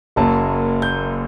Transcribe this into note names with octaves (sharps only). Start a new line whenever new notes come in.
F#1 F#2 F#3 A#3 A5
G6